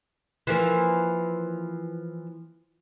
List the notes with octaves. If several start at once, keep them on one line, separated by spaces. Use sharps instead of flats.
E3 F3 A#3